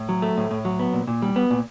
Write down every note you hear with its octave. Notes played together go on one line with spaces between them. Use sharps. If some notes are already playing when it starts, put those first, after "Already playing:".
Already playing: A2
F#3
A3
A2
A2
F#3
B3
A#2
A#2
G3
B3
A#2